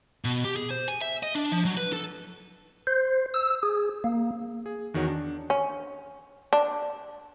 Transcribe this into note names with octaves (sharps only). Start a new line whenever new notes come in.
B2
G4
G#4
C5
G#5
E5
D#5
D4
F3
F#3
B4
A4
C5
E6
G#4
A#3
G#4
E2 D#3 F#4 C#5
D4
C#4
D4